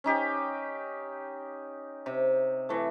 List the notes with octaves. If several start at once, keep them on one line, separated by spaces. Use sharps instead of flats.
C#4 D#4 G4
C3
E3 A3